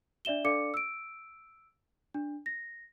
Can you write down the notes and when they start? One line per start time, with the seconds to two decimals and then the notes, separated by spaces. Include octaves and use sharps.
0.25 D4 D5 E5 E7 G7
0.44 D4 A4 D5 F5 D6 C#7
0.74 E6 D7
2.14 D4
2.46 A#6